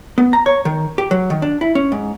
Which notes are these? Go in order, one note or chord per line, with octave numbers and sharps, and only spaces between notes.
B3
A#5
C#5
D#3
G4
F#3
D#3
D4
E4
C#4
G#2